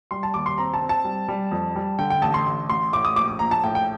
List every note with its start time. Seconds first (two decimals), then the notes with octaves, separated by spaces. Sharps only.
0.11 G3 C6
0.23 A5
0.34 D#2 D6
0.46 C6
0.58 C4 A#5
0.74 A5
0.81 C4
0.89 A5
1.05 G3
1.28 G3
1.51 F2
1.76 G3
1.99 D3 G5
2.10 G5
2.22 A1 A5
2.34 C6
2.46 A1
2.69 A1 C6
2.93 A2 D6
3.05 D#6
3.16 A#1 D6
3.28 D6
3.39 A#1 A#5
3.51 A5
3.63 A2 G5
3.75 G5